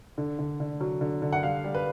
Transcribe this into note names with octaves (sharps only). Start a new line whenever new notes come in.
D3
D3
D3
F#3
D3
D3
F#5
G3 F5
G3
B4